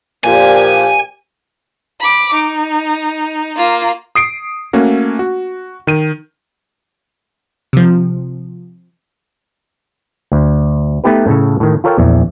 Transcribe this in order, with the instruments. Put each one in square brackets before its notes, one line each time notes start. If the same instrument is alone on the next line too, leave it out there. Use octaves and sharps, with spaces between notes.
[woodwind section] A#2 F3 [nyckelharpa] G4 [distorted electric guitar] G#5
[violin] B5 D6
D#4
A#3 F4
[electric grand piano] D#6 C7 D7
A3 A#3 C#4 F#4
F#4
D#3 D#7
[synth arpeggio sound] C3 F3
[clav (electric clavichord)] D2
A3 B3 D#4 G4 B4
A2 C#3 A4
A2 D#3
F4 A4 A#4 C#5 F5 G5
A#1 E2